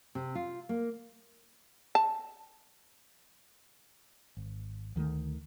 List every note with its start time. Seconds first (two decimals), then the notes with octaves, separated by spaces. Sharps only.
0.15 C3
0.35 F4
0.69 A#3
1.95 A5
4.37 G#1
4.96 D2 D#3 F3 A3